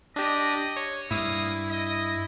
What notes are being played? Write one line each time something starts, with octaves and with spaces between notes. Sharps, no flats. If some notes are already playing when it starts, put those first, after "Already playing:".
D4 G4 D#5
C#5
G2 A#3 E4 D#6
D#5